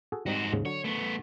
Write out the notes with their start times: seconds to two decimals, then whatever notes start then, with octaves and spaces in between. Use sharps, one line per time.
0.12 F#4 G#4 A4
0.26 G#2 G3 C4 D#4 F#4
0.52 D#2 G#2 C#3
0.65 D3 F#3 C#5
0.84 A3 B3